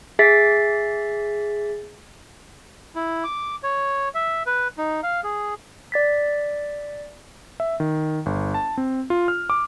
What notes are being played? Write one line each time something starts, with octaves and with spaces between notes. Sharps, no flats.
G#4 E5 A6 B6 C7
E4
D6
C#5
E5
B4
D#4
F5
G#4
D5 A6 B6
E5
D#3
G1
A5
C4
F4
F6
D6